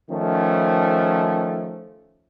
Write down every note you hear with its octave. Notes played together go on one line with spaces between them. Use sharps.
D#3 F3 A3 C#4